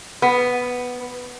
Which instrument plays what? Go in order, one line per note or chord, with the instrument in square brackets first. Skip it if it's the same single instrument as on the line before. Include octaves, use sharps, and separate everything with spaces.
[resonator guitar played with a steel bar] B3